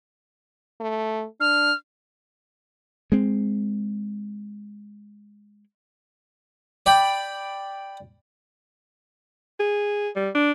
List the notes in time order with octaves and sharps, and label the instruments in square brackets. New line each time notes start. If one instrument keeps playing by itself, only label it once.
[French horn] A3
[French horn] D4 [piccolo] F6
[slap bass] G#3 C4
[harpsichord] D5 G5 B5
[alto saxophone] G#4
G3
D4